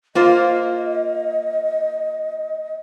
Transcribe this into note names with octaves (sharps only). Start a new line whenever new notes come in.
A#3 F4 C5 D#5